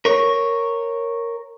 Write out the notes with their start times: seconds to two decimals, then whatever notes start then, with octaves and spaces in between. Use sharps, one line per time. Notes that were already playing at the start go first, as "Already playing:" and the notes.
0.05 A#4 C#5